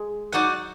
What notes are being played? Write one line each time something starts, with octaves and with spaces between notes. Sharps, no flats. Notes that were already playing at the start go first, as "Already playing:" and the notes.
Already playing: G#3
F#3 D#4 F#4 D5 F#5